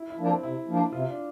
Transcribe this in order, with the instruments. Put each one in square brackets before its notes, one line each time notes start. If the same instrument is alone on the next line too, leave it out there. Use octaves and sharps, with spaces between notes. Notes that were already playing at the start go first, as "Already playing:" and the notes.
Already playing: [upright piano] E4
E4
[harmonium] F3 A#3 D4
[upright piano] C4
[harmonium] C3 [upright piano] E4
[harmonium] F3 A#3 D4
[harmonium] C3 [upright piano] F4
[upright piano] D4